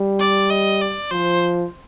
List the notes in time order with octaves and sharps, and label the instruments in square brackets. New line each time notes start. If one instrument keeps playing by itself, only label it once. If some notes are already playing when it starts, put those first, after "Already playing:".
Already playing: [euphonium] G3
[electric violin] D5
D#5
D5
[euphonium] F3 [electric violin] C5